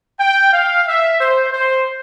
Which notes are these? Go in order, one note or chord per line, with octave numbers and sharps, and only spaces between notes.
G5
F5
E5
C5
C5